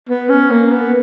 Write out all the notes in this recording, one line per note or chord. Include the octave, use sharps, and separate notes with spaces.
B3
C#4
A#3
B3